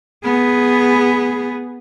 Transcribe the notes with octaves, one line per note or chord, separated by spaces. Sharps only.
B3 G#4